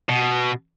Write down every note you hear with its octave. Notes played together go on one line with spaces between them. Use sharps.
B2